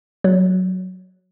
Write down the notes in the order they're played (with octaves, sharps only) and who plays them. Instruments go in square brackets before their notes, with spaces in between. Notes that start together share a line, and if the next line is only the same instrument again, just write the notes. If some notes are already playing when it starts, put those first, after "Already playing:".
[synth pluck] F#3